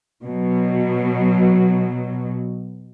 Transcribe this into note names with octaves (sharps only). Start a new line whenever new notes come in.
B2 F#3